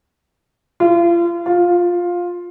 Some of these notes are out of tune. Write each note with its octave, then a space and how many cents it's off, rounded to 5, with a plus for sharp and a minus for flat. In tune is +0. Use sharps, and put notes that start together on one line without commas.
F4 -35
F4 +10